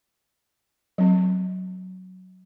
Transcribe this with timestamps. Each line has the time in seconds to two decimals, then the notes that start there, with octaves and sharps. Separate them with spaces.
0.98 F#3 C4